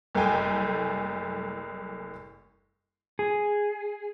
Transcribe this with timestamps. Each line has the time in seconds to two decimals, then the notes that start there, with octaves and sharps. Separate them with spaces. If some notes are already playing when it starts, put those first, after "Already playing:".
0.15 F#1 C2 A3 G5 G#5
3.19 G#4